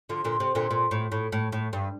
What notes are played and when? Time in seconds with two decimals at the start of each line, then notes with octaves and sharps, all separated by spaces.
0.09 D3 F3
0.24 A#2 D3
0.40 C3
0.55 A#2 D3
0.71 A#2
0.91 A2
1.12 A2
1.32 A2
1.52 A2
1.73 G2